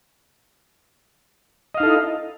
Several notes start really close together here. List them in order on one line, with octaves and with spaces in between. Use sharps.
D#5 F5 D#4 A4 E4